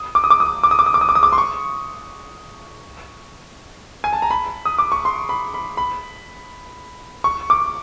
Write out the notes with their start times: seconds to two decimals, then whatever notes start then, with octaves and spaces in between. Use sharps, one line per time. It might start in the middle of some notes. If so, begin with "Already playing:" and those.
Already playing: D#6
0.15 D6
0.24 D#6
0.30 D6
0.40 D#6
0.63 D6
0.71 D#6
0.79 D6
0.86 D#6
0.94 D6
1.01 D#6
1.09 D6
1.15 D#6
1.23 D6
1.32 C6
1.38 C#6
4.04 G#5
4.13 A5
4.22 A#5
4.31 B5
4.65 D#6
4.79 D6
4.92 C#6
5.05 C6
5.29 B5
5.54 B5
5.77 B5
7.24 C#6
7.50 D6